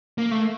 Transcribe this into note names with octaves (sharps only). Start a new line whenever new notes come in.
A#3
A3